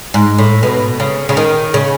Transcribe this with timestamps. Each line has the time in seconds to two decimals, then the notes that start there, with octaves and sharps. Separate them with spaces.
0.14 G#2
0.38 A2
0.63 B2
1.00 C#3
1.29 C#3
1.37 D#3
1.74 C#3